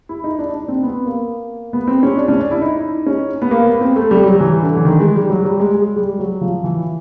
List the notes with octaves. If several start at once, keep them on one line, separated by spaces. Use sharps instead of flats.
E4
D#4
D4
D4
C4
B3
A#3
B3
C4
C#4
D4
C#4
D4
E4
D#4
C#4
B3
A#3
B3
C4
A3
G3
F#3
E3
D3
E3
D#3
G#3
G3
F#3
G3
G#3
G#3
G3
F#3
F3
E3